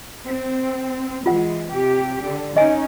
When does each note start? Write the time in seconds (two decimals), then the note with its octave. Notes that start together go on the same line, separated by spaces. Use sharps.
0.25 C4
1.26 E3 G#3 F4 F#5
1.70 C3 G4
2.20 D3
2.57 C#4 D#4 D#5 G#5